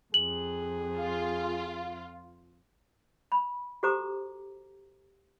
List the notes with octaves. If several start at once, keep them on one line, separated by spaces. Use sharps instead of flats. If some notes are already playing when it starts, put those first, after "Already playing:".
F2 G#4 F#7
F4
B5
F#4 G4 A4 C5 A#5 D6